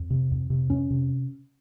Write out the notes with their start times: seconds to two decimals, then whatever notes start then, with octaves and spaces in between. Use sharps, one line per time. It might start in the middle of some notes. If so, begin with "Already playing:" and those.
Already playing: F2
0.10 C3
0.31 F2
0.50 C3
0.70 F2 C#4
0.91 C3